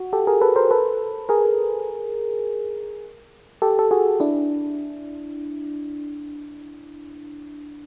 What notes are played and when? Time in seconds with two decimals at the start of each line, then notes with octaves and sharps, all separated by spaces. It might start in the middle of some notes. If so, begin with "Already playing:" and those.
Already playing: F#4
0.13 G4 A4
0.27 G#4 A#4
0.41 A4 B4
0.56 A#4 C5
0.71 A4 B4
1.29 G#4 A#4
3.62 G4 A4
3.79 A4
3.91 F#4 G#4
4.20 D4 E4